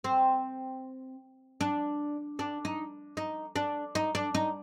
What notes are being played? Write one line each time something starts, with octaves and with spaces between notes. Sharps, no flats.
C4
D4
D4
D#4
D#4
D4
D#4
D4
D#4